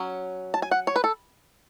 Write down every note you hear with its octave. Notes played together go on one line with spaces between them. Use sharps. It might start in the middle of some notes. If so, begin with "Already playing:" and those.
Already playing: F#3 C#4
A5
G#5
F#5
C#5
B4
A4